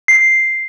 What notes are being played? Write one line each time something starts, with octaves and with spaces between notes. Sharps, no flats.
C7